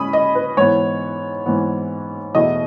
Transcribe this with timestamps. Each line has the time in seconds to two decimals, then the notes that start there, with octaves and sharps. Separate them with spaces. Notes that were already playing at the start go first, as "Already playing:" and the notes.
Already playing: A2 G#3 C#4 B5 D#6
0.13 D#5
0.35 B4
0.57 G#2 E3 B3 C#5
1.46 G#2 E3 B3
2.35 E2 B2 A3 E4 D#5